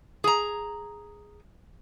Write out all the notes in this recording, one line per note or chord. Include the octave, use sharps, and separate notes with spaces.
G#4 A#5